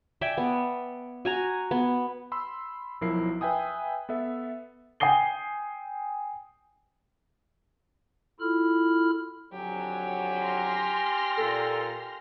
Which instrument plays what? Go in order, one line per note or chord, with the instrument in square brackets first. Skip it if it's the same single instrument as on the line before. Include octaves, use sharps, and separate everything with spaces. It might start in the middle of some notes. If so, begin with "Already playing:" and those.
[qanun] D5 E5 G5 G#5
B3
F#4 G#5 A#5
B3
[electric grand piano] B5 C6 E6
B1 F3 F#3 E4 A#4 C7
B4 E5 G5 G#5 D#6
B3 A4 E5
[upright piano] G5 G#5 D#6 C7 G7
[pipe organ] E4 F4 A4 B5 F6
[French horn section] F2 D3 F#3 [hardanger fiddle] G4 G#5
[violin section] C6 F6 A#6
[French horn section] A#2 [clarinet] A4